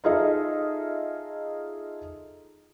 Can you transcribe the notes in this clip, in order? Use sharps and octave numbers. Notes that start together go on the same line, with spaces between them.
D#4 F4 G#4 A4 D#5 E5